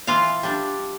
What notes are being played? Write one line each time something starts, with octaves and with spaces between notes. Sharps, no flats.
E3 F4 F5
G3 D4